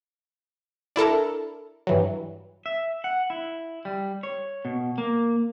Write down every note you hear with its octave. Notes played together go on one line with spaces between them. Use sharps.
D4 E4 A4 A#4
G2 E3 F#3
E5
F#5
E4
G3
C#5
B2
A#3